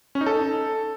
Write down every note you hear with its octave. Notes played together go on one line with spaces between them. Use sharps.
C#4
D#4
A4